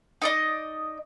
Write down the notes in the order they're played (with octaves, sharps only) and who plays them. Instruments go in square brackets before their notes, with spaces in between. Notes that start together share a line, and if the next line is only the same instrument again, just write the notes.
[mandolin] D#4 D5 D#5